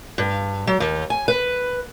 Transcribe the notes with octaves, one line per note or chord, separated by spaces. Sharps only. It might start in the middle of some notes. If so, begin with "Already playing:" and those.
G2
F#3
D#2
G#5
B4